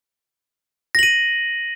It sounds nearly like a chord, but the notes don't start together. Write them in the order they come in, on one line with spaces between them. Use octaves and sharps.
A#6 F#7 D#7